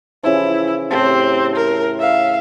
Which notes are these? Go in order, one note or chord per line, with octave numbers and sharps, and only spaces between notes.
C#3 E3 F3 E4
A2 C4 G4 A5
A#4
E5 F5